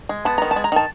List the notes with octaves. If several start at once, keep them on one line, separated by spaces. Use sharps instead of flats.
G#3
B3 A5
D#3 A#5
A5
G#3
A#5
D#3 A5